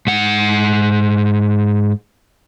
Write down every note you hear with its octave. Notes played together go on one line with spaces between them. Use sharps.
G#2 F#5